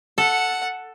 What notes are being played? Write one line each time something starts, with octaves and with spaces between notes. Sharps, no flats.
A4 F#5